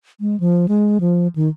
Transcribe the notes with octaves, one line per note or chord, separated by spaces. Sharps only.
G#3
F3
G#3
F3
D#3